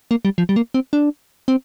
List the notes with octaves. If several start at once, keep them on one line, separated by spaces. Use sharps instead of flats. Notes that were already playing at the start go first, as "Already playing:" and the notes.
A#3
G3
F3
G3
A#3
C4
D4
C4